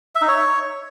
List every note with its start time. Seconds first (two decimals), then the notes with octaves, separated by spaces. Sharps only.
0.15 E5
0.22 D#4
0.28 C#5